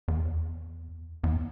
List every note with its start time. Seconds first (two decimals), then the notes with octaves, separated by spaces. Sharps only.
0.08 E2
1.23 E2